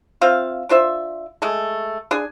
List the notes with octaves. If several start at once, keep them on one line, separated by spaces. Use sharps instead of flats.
C4 F4 E5 F5
D4 F4 C5 E5
G#3 A3
D4 G#4 G#5